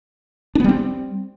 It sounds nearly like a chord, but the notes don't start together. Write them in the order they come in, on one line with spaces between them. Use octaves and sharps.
D4 B3 G3 C4